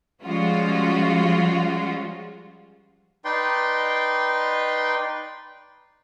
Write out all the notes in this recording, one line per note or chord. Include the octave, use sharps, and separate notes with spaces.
F3 G3 G#3 C#4 F4 F#4
D#4 B4 D5 G5 C6